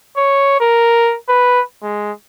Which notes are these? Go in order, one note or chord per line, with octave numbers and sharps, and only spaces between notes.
C#5
A#4
B4
G#3